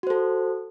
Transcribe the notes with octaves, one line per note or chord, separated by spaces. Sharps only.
F#4 A4 C5